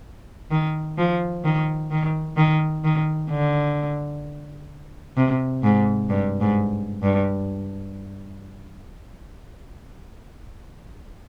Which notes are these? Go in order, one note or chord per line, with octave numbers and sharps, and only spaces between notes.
D#3
F3
D#3
D#3
D#3
D#3
D3
C3
G#2
G2
G#2
G2